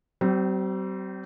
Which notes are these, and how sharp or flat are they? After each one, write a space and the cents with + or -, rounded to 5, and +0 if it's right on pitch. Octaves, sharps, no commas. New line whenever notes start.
G3 -45 C4 -20